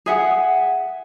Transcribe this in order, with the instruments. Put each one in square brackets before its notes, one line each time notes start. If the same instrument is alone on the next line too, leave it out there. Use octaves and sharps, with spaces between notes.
[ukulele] G#4 E5 F#5